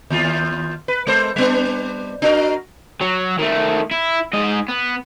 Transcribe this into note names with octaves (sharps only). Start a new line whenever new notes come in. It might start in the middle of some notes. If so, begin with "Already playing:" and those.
D#2 F4
B4
G#3 A4 C5
G3 B3 D4
D4 F#4 A#4
F#3
D#3 A3
E4
G#2 D#5
B3